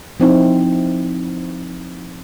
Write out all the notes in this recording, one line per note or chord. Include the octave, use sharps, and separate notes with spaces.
F3 C4 D#4 E4